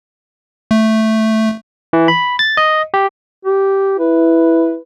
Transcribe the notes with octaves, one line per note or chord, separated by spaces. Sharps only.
A3
E3
B5
A6
D#5
G4
G4
E4 B4